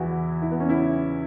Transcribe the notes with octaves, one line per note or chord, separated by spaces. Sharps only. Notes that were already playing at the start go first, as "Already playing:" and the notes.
Already playing: E2 E3 E4 F#4
E4
B3
C#4
E4